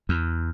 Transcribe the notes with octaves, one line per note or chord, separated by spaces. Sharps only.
E2